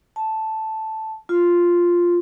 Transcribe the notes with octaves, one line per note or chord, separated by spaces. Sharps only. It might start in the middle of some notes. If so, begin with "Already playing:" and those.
A5
F4